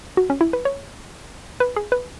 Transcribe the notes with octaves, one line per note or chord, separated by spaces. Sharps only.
F#4
C#4
E4
B4
C#5
B4
G#4
B4